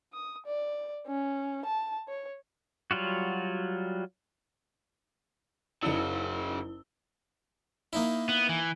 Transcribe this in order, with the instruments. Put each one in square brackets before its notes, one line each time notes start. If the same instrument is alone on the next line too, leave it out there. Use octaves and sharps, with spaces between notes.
[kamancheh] D#6
D5
C#4
A5
C#5
[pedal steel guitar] F#3 G3 F4 F#4
[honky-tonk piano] F#1 D#4 E6 [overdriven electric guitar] C#3 F#3 [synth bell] E4 G7
[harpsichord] A#3 D#4 E4
[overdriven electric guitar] B3
E3